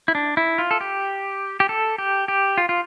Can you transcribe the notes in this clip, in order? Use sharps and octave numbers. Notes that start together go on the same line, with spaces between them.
E4
D4
E4
F4
A4
G4
G4
A4
G4
G4
F4
F4